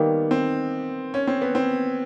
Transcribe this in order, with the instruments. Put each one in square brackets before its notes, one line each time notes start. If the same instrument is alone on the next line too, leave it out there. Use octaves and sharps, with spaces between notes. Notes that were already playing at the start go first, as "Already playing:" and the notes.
Already playing: [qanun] D#3 G3 A#3 [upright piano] B3
[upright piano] C4
C#4
C4
B3
C4